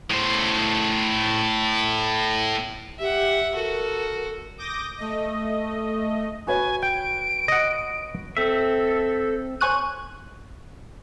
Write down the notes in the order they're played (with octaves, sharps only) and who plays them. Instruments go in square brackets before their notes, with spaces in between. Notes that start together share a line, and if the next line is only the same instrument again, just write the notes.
[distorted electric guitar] A2 C5
[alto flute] G4 [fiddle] E5 F#5
[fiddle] F#4 A4 [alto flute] A#4
[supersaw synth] D6 D#6 G6 A#6
A3 D#5
[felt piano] F#4 B4 C#5 [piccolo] G#5
[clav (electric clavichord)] G5 [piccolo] D7
[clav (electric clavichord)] D#5 F#5
[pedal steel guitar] C4 E5 [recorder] A4
[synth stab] C5 C#5 G#5 C#6 F#6 D#7